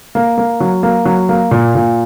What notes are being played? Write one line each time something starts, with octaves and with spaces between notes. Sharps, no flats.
A#3
A#3
F#3
A#3
F#3
A#3
A#2
A#2